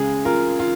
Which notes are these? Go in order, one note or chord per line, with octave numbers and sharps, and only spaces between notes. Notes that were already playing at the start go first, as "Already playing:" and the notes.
Already playing: C#2 C#3 G#3 G#4
F4 A#4
F4